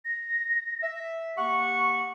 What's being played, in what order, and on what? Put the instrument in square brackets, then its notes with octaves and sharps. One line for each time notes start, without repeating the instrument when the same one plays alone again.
[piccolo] A#6
[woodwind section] E5
[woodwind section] A#3 G4 F#5 [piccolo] C#6